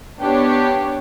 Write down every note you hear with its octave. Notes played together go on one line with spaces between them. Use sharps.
B3 D4 G4 C#5